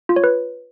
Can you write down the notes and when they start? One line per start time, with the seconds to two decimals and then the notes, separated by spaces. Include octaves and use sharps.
0.09 F4
0.16 C#5
0.24 B4